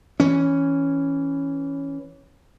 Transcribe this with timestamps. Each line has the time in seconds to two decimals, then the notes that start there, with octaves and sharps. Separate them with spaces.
0.20 E3 C#4